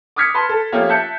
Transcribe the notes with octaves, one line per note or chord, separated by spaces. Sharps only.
D6 D#6 F6 G#6 B6 C#7
B4 A5 C6
A4
F3 A3 A#3 C#4 F4 G4
E5 A5 F#6 G6 C#7